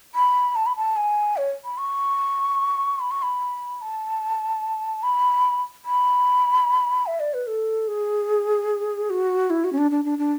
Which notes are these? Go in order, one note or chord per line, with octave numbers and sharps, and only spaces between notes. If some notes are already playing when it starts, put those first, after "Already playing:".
B5
A5
B5
A5
G#5
C#5
B5
C#6
B5
C#6
B5
A5
B5
B5
E5
D5
B4
A4
G#4
F#4
E4
F#4
C#4
D4
D4
D4
D4